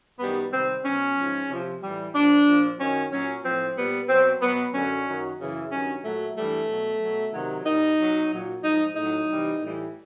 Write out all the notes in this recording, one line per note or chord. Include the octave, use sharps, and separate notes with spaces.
F#2 D#3 G3 B3
C3 D#3 G3 C4
B2 F#3 C#4
G#2 F3
C3 F3
A2 E3 G3
A#2 F3 D4
A#2 F3
F#2 D#3 F#3 C#4
A#2 F#3 C#4
A2 F3 C4
A#2 G3 B3
B2 F#3 C4
B2 F#3 B3
F#2 D3 F#3 C#4
F#2 D#3 F#3
F#2 C#3 E3
G2 D#3 F#3 C#4
A#2 F#3 A3
G2 E3 G3 A3
B2 F#3
B2 F#3
C3 D#3 F#3
A#2 G3 D#4
B2 F#3
A#2 F#3
G#2 F3 D#4
A2 F#3 D#4
C3 E3 G3
A2 E3 G3